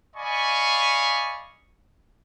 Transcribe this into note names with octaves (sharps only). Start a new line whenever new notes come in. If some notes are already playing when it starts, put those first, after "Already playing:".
D5 D#5 F5 G#5 B5 C#6